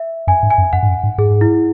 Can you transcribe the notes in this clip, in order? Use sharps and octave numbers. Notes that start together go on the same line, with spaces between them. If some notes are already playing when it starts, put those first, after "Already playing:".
Already playing: E5
F#2 G#5
G#2
G#5
F#2
F#2 F#5
G#2
F#2
G#2
G#2 G#4
E4